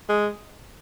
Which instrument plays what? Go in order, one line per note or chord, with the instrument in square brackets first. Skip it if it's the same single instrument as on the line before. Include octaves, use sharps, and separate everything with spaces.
[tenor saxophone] G#3